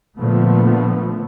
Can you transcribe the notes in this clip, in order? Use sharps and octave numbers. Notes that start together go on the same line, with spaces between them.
A#2 D3 F3 A3 B3